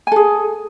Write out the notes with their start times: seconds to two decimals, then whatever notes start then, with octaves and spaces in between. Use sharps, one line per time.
0.07 G#5
0.12 A4
0.16 G#4